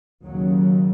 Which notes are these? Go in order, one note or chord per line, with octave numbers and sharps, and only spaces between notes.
D#2 C#3 F#3